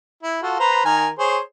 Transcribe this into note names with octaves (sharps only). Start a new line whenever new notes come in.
E4
F4 F#4 A4
B4 C5 A#5
D#3 A#4 G#5
G#4 C5 C#5